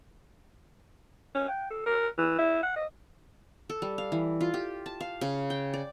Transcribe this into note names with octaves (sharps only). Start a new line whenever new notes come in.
C#4
G5
A4
A#4
E3
E4
F#5
D#5
A4
G3
F5
E3
F4
G4
A5
F5
C#3
G5
D5